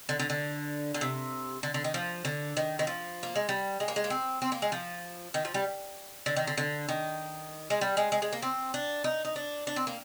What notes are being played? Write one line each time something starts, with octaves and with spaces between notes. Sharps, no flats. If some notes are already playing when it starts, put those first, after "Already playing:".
D3
D3
D3
D3
C3
D3
D3
D#3
F3
D3
D#3
D#3
F3
A#3
G#3
G3
G#3
A#3
G#3
A#3
C4
C4
A#3
G#3
F3
D#3
F3
G3
D3
D#3
D3
D3
D#3
G#3
G3
G#3
G#3
G#3
A#3
C4
D4
D#4
D#4
D4
D4
C4
A#3